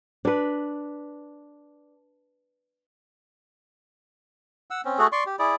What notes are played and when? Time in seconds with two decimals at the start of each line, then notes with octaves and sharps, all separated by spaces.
0.25 D4 B4
4.71 F#5 E6
4.85 C4 C#4
4.99 A3 F#4 G#4 A4
5.12 D5 C6 C#6
5.26 G4
5.39 E4 G#4 D5